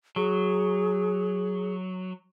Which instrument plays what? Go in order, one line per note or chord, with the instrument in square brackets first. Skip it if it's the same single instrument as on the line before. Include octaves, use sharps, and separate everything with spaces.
[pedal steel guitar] F#3 [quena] G#4